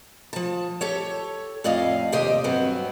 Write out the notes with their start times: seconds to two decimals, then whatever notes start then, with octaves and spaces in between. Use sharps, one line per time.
0.33 F3 A5
0.81 G4 A4 C#5
1.64 F2 A2 D5 D#5 F5
2.12 D#2 C3 G4 C5 D5 D#5
2.44 G2 F#3 B3 C4